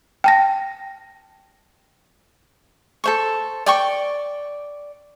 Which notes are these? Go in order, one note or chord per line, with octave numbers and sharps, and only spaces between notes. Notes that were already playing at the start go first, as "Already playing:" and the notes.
G5 A5 A#6
A4 C5 C#6
D5 G5 C#6